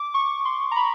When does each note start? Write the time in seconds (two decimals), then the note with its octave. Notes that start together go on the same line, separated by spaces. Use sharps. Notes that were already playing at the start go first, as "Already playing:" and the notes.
Already playing: D6
0.14 C#6
0.45 C6
0.71 A#5
0.76 B5